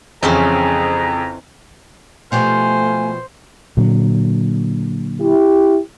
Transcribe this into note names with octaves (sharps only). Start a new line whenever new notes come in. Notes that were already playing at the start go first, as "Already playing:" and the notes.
F2 C#3 E3 C4 C#4 G#4 A#5
B2 F3 A3 G4 C5 G#5
A#2 D3 F#3
E4 G4